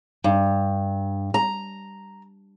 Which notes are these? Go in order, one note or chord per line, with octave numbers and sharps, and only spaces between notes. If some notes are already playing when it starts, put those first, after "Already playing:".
G2
A#5